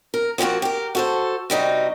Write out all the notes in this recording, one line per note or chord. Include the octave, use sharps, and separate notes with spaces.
A#4
F3 G3 A#3 C4 F#4
G4 A#4
F#4 A4 C5
C3 G3 D#4 F#4